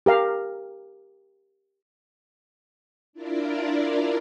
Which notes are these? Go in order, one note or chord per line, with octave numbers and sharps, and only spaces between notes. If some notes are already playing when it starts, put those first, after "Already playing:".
G4 A#4 F5
D4 E4 F4 A#4 D5